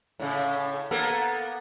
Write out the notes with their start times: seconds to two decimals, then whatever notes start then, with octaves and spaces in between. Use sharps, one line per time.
0.20 A2 C#3
0.91 A#3 B3 A4